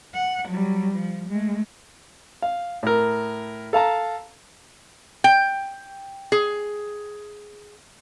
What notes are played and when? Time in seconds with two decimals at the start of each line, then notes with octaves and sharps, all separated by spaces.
0.15 F#5
0.48 F#3 G3
0.93 F3
1.28 G#3 A3
2.42 F5
2.83 A2 A#4
3.73 A4 F5 A5 A#5
5.24 G5
6.32 G#4